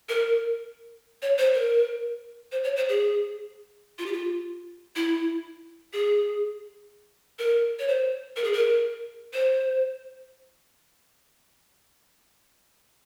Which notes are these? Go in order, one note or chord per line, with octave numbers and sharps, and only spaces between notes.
A#4
C#5
C5
A#4
C5
C#5
C5
G#4
F4
G4
F4
E4
G#4
A#4
C#5
C5
A#4
G#4
A#4
C5